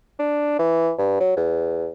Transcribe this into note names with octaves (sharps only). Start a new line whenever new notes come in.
D4
E3
G2
F#3
E2